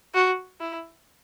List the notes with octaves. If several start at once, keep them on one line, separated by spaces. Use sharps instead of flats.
F#4
E4